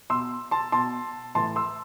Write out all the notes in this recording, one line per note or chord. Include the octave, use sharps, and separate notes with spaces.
B2 C6 E6
A5 C6
B2 A5 C6
A2 E3 A5 C6
C6 E6